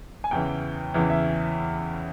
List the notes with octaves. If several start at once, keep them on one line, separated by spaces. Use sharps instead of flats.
G#5
E2 C#3 E3 G5
E2 C#3 E3
E5